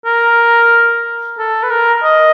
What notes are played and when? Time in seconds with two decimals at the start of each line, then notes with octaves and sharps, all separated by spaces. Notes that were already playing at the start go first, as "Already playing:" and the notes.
0.05 A#4
1.38 A4
1.63 B4
1.71 A#4
2.04 D#5